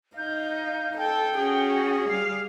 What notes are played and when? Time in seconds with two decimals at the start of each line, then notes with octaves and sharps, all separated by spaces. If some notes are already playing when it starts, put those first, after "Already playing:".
0.17 D#4 F5 G6
0.97 A4 G5
1.37 C#4 F#4 G#4
2.09 G3 F5 C7